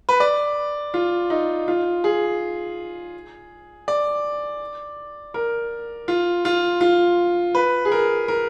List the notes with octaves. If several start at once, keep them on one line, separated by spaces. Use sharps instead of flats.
B4
D5
F4
D#4
F4
G#4
D5
A#4
F4
F4
F4
B4
G#4
A#4
A#4